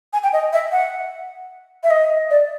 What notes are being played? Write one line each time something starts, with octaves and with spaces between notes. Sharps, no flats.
G#5
G5
D#5
E5
F#5
E5
D#5
D5